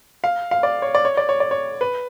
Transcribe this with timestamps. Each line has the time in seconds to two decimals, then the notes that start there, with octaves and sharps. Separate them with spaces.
0.24 F5
0.51 F5
0.63 D5
0.82 C#5
0.95 D5
1.05 C#5
1.17 D5
1.29 C#5
1.40 D5
1.51 C#5
1.81 B4